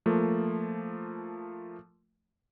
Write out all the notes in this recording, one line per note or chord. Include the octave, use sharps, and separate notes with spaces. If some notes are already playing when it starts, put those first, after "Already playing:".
F3 A3 A#3